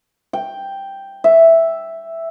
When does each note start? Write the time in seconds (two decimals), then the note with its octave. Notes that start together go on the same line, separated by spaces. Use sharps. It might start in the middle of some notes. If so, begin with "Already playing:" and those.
0.33 G5
1.24 E5